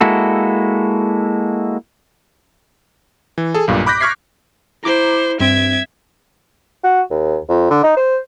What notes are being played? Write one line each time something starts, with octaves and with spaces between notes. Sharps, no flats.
G#3 A#3 E4 F#4 A4
E3
G#4 A4
B1 G2 A#2
B5 D6 F#6 G6 A#6 B6
C#6 D6 F6 G#6 B6 C7
E4 C5 A#5 D6
G2 C4 E5 G#6 D7
F#4
D#2
F2
D3
D#4
C5